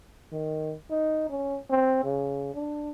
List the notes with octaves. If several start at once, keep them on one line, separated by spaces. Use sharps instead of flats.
D#3
D#4
C#4
C4
C#3
D4